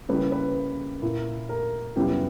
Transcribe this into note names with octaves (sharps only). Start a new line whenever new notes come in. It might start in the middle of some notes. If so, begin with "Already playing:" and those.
C#3 G3 A#3 E4 B4
B4
A#2 A#3 E4
A#4
F#2 C#3 G3 B3 E4 G4